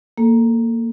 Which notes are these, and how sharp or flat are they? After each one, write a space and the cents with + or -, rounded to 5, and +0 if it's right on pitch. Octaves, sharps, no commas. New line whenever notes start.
A#3 -15 A4 +0